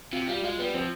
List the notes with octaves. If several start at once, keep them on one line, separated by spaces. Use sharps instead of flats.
C3 F4
G3 F4
G#3 F4
G3 B3
F3 C4